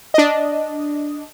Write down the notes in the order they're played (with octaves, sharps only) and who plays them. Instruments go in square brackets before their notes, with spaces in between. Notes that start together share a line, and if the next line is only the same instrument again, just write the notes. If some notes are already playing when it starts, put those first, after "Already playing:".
[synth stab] D4 D#5